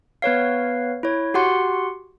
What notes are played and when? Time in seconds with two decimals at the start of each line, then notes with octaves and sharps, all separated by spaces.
0.22 B3 B4 C#5 F5
1.03 E4 C#5
1.34 F#4 G4 F#5 C6